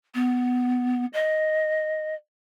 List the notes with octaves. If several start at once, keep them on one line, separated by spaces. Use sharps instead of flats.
B3
D#5